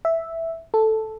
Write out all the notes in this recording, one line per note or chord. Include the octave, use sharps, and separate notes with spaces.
E5
A4